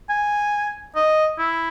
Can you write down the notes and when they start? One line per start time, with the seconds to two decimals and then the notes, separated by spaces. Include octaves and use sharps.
0.09 G#5
0.95 D#5
1.39 E4